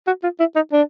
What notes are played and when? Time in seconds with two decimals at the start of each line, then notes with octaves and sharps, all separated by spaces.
0.07 F#4
0.23 F4
0.40 E4
0.56 D#4
0.72 D4